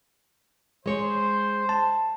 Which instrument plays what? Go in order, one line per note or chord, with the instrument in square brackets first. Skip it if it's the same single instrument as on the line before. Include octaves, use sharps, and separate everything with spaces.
[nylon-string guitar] G#3 C#5 [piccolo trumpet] C5
[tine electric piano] A5